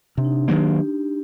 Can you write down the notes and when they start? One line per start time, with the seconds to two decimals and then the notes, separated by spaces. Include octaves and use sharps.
0.17 C3 D4
0.25 D#4
0.31 D4
0.48 D#3 F#3 A#3 G4